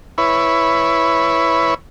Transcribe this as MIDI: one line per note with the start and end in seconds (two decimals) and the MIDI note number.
0.18 1.74 64
0.18 1.74 71
0.18 1.74 73